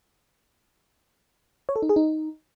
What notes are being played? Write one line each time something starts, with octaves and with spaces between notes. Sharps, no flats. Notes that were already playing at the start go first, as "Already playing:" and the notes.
C#5
A4
D#4
G#4
D#4